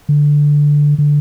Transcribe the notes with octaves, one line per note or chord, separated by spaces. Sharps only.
D3
D3